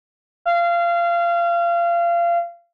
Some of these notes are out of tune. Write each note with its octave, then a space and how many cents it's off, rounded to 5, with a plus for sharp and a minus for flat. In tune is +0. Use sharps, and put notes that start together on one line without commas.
F5 -25